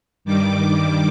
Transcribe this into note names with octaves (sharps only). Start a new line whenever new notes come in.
G2 D#3 G3 D6